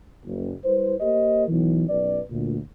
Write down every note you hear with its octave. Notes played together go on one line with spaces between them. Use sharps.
F#1
G3 E4 B4 C5
A#3 G4 A#4 C5 D#5
B1 E3
B1 F#2 B4 D5
D2 A#2